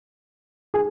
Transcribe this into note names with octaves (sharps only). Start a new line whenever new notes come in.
G#4